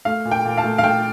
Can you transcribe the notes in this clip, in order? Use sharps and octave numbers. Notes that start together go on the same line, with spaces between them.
A3 F5
A#2
G5
A#2
F5 A5
A3
F5
A3 G5